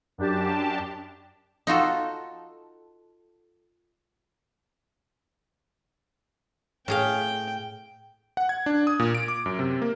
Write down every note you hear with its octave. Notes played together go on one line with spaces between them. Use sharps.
F#2 D4 G4 A5
D#4 F4 F#4 A4
A2 G#4 F5 G5
F#5
G#6
D4
D#6
A#2
D7
D6
F#2
C3
A#3